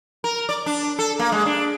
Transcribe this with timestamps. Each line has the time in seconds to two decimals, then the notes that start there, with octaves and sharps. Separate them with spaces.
0.24 A#4
0.49 D5
0.66 D4
0.99 A4
1.19 A#3
1.32 G#3
1.46 D4